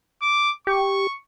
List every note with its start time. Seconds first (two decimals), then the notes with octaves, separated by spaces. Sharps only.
0.22 D6
0.67 G4 C#6